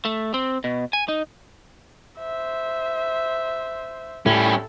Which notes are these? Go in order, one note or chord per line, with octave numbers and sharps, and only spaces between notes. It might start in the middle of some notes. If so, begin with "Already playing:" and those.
A3
C4
B2
G#5
D#4
C5 E5
A2 G3 C#4 A4